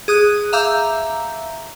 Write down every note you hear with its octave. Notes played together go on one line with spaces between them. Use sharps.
G#4 D#6 F#6
E5 F5 A#5 D6 E6 G6